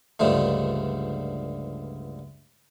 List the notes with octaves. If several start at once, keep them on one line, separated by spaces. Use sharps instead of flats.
C#2 G2 D3 F3 A3